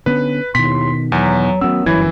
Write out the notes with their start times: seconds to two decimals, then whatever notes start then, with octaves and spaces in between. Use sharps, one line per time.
0.06 D3 B3 C#4 B4
0.55 D#2 B2 D#3 E4 C6 B6
1.12 E2 F#3
1.61 D#3 F#3 A3 B3 C#4 E6
1.86 G1 F#2 E3 F#3 C#4 E4 G#6